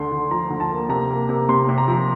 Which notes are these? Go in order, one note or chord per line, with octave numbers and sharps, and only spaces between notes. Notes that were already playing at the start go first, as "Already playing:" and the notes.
Already playing: D2 D3 C6
D3
F3 A#5
D2
A5
A#3
C3 A#5
A#3
C3
C3 C6
C3
A#5
F3